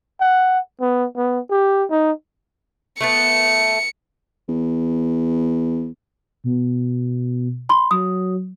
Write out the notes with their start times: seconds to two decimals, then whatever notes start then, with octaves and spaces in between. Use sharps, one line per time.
0.20 F#5
0.81 B3
1.17 B3
1.51 G4
1.90 D#4
3.01 A3 B3 A5 C#7
4.48 E2
6.44 B2
7.69 B5 C6
7.91 F#3 D#6